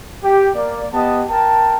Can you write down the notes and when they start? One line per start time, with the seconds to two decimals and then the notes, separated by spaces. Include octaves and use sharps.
0.24 G4
0.55 A#3 D5
0.93 B3 G4 D#5 A5
1.30 A#4 G5 A5